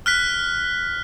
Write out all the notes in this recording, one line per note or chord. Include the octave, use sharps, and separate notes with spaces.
F6 F#6 B6